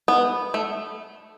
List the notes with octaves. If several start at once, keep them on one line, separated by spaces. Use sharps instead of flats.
B3
A3